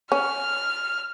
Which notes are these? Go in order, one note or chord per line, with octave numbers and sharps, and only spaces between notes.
C#4 F6